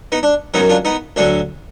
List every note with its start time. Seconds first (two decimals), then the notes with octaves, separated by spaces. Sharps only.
0.12 B3 D#4
0.23 D4
0.54 F#2 D#3 F#3 B3 D#4
0.69 D4 F4
0.85 B3 D#4
1.16 D2 D3 F#3 D4